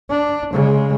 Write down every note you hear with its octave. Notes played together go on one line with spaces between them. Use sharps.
D4
C#3 G#3